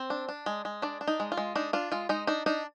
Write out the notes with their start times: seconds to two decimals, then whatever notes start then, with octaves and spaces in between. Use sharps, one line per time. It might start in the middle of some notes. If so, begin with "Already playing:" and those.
Already playing: C4
0.10 D4
0.29 D4
0.46 G#3
0.65 G#3
0.82 D4 D5
1.01 D4
1.07 D#4
1.20 G#3
1.32 F4
1.37 G#3
1.55 D4 D#4
1.73 D4 F4
1.92 G#3 F4
2.09 G#3 D#4
2.27 D4 D#4
2.46 D4 D#4